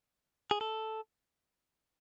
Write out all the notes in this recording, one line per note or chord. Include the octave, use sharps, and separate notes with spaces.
G#4
A4